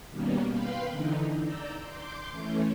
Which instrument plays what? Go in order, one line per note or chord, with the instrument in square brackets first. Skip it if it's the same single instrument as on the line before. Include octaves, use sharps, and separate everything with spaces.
[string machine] B2 D#3 G3 A#3 B3 C#4
B4 F5 G5 B5 C6
D3 E3 D#4
D5 A#5 E6 G6
C6 D6 G6
E3 A3 C#4